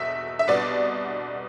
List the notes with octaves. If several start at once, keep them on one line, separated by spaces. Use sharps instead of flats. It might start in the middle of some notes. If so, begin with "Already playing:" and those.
Already playing: E2 B2 E5
E5
C2 B2 B3 D4 D5